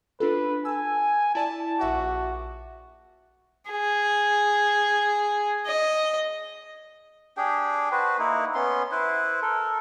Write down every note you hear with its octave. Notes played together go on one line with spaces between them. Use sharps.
D4 F4 A4 B4
G#5 A5 E6
E4 D5 G#5 A5
A#1 F#4 E5 D6
G#4
D#5
D4 G4 G#4 G5
F#4 B4 C5
A#3 D#4 E4
B3 C#4 C6
E4 B4 C5
A4 A#4